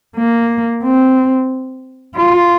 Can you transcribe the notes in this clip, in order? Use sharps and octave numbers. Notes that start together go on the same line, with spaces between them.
A#3
C4
F4